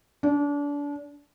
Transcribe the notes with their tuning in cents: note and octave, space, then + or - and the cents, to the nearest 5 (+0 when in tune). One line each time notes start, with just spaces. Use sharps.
D4 -30